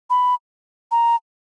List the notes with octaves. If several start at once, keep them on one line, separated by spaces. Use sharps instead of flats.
B5
A#5